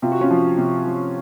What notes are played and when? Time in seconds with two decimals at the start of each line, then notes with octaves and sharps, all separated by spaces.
0.02 C3 F4
0.12 F#4
0.21 C#4 F4
0.30 F3
0.58 C3
0.85 F3